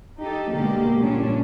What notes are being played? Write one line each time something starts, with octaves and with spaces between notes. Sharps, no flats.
D#4 G4 A4
B2 D3 G#3 A#3 G4
A#2 D3 G3 C#4 D4